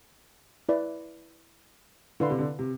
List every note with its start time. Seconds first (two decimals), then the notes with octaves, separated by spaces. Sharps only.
0.69 E4 B4 D5
2.20 D3 E4 B4 F5 C6
2.30 C3
2.38 D3
2.59 C3